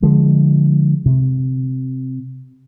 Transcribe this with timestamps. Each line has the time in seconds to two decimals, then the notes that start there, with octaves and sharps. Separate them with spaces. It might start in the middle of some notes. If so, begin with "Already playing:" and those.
0.03 D3 F3 G#3
1.06 C3